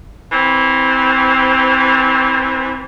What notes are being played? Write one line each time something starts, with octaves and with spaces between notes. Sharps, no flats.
E3 C4